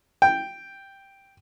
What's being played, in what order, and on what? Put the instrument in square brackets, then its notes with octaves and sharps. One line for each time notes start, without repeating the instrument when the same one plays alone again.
[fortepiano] G5